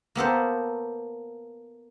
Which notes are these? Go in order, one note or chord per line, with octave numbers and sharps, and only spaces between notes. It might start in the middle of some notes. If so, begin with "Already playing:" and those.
A#3 B3 A4 C5